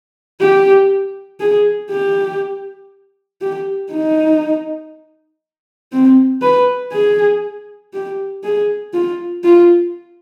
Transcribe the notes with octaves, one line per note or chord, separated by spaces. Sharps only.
G4
G#4
G4
G4
D#4
C4
B4
G#4
G4
G#4
F4
F4